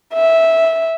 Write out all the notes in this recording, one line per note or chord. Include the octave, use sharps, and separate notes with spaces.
E5